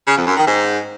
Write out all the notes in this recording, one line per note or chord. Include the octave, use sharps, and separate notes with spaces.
C#3
F2
F#2
D#3
G#2